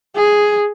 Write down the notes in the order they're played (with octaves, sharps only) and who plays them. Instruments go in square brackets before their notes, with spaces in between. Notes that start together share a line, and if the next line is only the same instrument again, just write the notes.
[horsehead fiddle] G#4